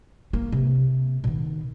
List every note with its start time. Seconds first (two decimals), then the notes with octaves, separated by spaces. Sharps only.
0.33 A#3
0.52 C3
1.24 B2 D#3